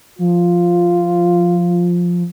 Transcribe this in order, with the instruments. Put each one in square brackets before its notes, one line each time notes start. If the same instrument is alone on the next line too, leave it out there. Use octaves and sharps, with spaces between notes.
[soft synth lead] F3 [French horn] F4